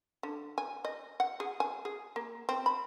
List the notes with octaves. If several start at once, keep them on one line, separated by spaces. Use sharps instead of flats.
D3
G#5
D#5
F#5
G#4
G#5
G#4
A#3
C4
B5